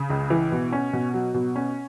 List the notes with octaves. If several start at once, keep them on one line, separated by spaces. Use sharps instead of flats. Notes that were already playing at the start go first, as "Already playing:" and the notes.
Already playing: C#3
C#2
E3
B2
C#4
B2
F#3
B2
C#4